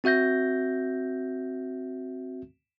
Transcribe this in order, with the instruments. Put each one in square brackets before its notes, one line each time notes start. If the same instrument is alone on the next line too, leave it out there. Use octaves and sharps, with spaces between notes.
[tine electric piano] C4 F#4 E5 G6 A#6